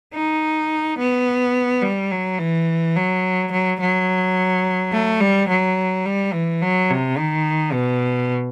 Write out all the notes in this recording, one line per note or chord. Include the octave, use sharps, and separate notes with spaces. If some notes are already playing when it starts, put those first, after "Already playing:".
D#4
B3
G3
F#3
E3
F#3
F#3
F#3
A3
G3
F#3
G3
E3
F#3
C3
D#3
B2